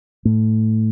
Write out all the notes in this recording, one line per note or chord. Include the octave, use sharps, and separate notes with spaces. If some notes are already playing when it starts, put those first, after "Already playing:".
A2